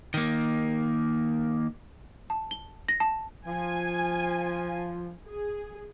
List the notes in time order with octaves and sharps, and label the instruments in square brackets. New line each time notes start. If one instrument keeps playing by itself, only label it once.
[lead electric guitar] D#3 A#3
[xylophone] A5
G7
A#6
A5
[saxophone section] F3 [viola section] G#5
[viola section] G#4